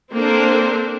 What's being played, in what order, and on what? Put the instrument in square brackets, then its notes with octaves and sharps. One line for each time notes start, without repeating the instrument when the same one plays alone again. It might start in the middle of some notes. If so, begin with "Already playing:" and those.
[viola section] A#3 C4 D4 A4 A#4 C5